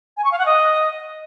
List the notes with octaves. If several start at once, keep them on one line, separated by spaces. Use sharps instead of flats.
G#5
C#6
F5
F#5
D#5